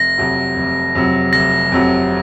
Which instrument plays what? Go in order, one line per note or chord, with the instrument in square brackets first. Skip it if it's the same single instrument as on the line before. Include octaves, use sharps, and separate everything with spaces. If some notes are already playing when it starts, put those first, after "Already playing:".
Already playing: [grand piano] F1 [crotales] A#6
[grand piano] F2 C3 F#3
F1
F2 C3 F#3
[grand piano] F1 [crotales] A#6
[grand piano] F2 C3 F#3